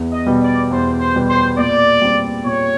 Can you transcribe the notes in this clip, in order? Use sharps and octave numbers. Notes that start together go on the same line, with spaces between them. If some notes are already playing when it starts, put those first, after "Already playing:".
Already playing: E2
D#5
B2 G3 B3
D5
E2 C5
C5
B2 G3 B3
C5
A#2 D5
G3 C4
A#2 C#5